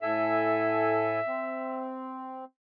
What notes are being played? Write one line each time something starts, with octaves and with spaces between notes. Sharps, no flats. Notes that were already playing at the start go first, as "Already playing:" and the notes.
A2 A4 E5 G#5
C4